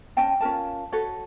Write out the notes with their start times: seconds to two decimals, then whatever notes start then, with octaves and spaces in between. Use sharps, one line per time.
0.17 C#4 D#5 G5 A5
0.40 C#4 F4 A#4 A5
0.92 F#4 A4 B4 C#5